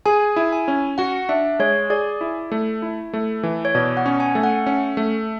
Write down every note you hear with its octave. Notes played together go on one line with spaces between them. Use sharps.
G#4 G#5
E4
G#5
C#4
F#4 F#5
D4 E5
G#3 C#5
G#4 D5
E4
A3
E4
A3
E3
C#5
B2 D5
F#5
C#4
G#5
A3
F#5
C#4
A3